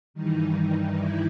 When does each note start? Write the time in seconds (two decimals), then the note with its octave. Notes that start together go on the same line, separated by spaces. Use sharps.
0.14 G2 D#3 E3 G3 D#4
0.96 E3 E4